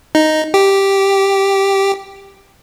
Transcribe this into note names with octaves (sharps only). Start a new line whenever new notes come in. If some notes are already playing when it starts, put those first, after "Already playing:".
D#4
G4